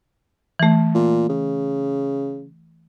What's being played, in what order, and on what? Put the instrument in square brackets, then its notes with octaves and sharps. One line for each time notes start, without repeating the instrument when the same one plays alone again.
[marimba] E3 A3
[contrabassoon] A#2
C#3